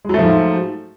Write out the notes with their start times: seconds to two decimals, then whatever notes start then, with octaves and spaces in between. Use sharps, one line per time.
0.05 G#3
0.09 F#3
0.14 A3
0.19 F3
0.23 G#2